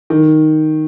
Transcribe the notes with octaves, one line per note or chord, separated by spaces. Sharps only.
D#3